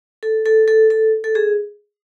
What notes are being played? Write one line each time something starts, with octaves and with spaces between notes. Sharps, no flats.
A4
A4
A4
A4
A4
G#4